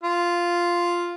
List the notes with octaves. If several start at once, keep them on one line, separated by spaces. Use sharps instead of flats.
F4